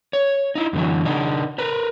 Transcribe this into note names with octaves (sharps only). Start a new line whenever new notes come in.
C#5
D#4 E4
F#2 D3 E3 F#3
C#3 D4 D#4
A#4 B4